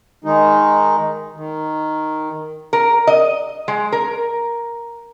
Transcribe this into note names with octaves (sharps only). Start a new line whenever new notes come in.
D#3 G#3 D#4
D#3
A#4
D#5
G#3
A#4